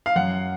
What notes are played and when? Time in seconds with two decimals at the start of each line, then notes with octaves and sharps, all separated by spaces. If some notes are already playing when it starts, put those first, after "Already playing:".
0.06 F5
0.16 F#2 F#5